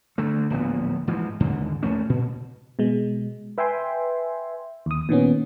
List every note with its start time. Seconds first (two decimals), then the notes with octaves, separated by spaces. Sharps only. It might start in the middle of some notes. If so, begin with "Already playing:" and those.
0.18 D3 A3
0.50 D1 A#1 B3
1.07 G#2 E3 F3
1.40 D#2 G#2 D3
1.83 D#2 A3 C#4
2.09 A#2
2.79 B2 G#3
3.58 B4 E5 G5 G#5 C6
4.86 D#2 D#6
5.09 A#2 D#3 B3 C#4